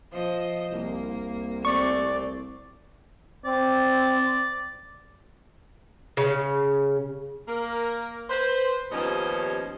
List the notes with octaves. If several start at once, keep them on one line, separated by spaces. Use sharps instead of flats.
F3 C5 D#5
C2 A#3
A3 C4 D5 C#6
C4 D5
C#3
A#3 A#4
B4 C5
D#2 F3 G3 B3 C#4 D#5